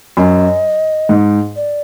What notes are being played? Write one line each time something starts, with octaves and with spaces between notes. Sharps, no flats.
F#2 D#5
G#2
D5